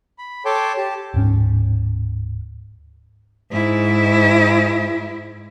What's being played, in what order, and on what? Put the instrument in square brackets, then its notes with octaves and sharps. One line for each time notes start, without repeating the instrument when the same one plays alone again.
[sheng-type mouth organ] B5
A4 C#5 G5 A5 C6 D6
G4 A5
[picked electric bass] D1 G#2 C#4
[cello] G#2 E4